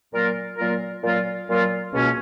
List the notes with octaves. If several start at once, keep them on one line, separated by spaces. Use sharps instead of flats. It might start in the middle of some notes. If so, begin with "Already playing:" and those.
A#2 F#3 A#3 F4 A#4
A#2 F#3 A#3 F4 A#4
A#2 F#3 A#3 F4 A#4
A#2 F#3 A#3 F4 A#4
C#2 B2 A#3 C#4